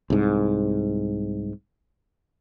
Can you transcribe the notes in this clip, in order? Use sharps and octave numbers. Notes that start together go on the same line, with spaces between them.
C2 G#2